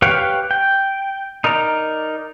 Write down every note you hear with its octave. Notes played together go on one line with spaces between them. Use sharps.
G4 B4 C#5 F5 G5
G5
D#4 A#4 D5 A#5